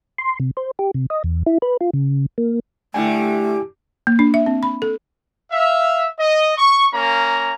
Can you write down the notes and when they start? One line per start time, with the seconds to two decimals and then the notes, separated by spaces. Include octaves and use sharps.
0.18 C6
0.40 C3
0.57 C5
0.79 G4
0.94 C3
1.10 D#5
1.24 E2
1.46 E4
1.62 B4
1.81 F4
1.93 C#3
2.38 A#3
2.94 D3 G3 A3 E4 G5 G#5
4.07 A#3
4.19 D4
4.34 E5
4.46 C4
4.63 B5
4.82 A4
5.51 E5 F5
6.18 D#5
6.57 C#6
6.93 A#3 C#4 A#5